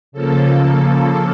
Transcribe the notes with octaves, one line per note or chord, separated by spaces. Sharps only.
C#3 F3 A#3 A4
A4